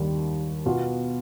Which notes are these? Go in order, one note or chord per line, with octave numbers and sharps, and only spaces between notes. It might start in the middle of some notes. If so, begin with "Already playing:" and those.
Already playing: D#2 D#3 G3
B2 B3 F4